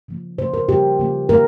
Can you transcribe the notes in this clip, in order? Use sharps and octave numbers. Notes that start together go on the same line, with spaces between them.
C#3 F3 A#3
C#3 F3 A#3 C5
A#4
C#3 F3 A#3 G4
C#3 F3 A#3
D#3 A#3 A#4